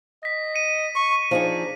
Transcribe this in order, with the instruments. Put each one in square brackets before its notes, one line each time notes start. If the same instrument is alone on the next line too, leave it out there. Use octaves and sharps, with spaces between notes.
[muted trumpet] D#5 [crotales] A#6 B6
[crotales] C#7 D#7
[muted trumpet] C#6
[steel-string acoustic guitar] F3 D#4 G#4 [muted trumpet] D4